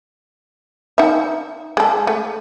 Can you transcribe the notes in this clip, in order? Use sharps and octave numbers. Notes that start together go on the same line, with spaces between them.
D#4 E5
G#3 A4
A3